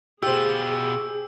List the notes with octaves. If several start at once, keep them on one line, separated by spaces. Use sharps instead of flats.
B2 F4 G4 G#4 C5 E6